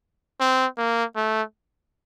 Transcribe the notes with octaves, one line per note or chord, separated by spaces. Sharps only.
C4
A#3
A3